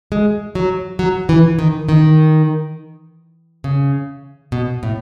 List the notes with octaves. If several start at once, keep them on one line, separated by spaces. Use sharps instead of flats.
G#3
F#3
F#3
E3
D#3
D#3
C#3
B2
A2